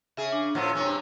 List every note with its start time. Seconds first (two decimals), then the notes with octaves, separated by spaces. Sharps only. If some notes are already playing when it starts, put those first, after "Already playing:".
0.17 C#3 G#4 E5
0.32 D4
0.55 A2 F3 B3 C#5 E6
0.76 G2 C3 C#4